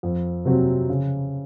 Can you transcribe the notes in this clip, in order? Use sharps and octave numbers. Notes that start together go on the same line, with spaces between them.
F2
C3 F#3 C4
C#3